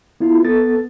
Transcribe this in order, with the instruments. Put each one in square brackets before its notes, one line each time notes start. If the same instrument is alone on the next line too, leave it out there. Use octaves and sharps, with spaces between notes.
[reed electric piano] B3 E4 F4
B3 A4 A6